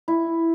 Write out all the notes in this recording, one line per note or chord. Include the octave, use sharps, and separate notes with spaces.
E4